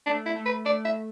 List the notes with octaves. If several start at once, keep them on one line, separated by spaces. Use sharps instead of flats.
A3 D4
E4
A3
B4
A3 D5
E5